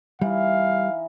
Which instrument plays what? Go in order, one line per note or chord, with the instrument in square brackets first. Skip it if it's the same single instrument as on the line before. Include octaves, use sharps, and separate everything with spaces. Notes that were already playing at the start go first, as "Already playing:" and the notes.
[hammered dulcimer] E3 D#4 [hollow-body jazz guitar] G3 [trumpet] F5